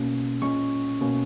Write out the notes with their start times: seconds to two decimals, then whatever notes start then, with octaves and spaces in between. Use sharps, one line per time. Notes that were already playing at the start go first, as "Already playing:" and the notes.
Already playing: B2 A#3 C#4
0.42 A#2 G#3 C#4 C#6
1.01 B2 A#3 C#4